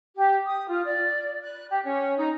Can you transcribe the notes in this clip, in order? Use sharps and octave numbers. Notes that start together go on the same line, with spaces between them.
G4
D#6
F4
D5
F#6
G4
C#4
D#4